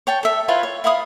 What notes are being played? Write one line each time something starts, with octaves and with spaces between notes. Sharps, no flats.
C#5 G5 A5
A4 E5
E4 F4 B4 C#5
C#5
E4 F5 B5 D#6